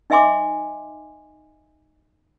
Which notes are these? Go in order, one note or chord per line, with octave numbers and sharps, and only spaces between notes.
D#4 D#5 E5 G#5 C6 D6